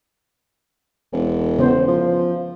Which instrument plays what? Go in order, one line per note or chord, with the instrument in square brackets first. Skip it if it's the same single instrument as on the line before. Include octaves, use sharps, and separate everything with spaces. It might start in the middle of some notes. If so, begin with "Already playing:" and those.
[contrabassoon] E1
[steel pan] C#3 B3 C5
[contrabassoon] F3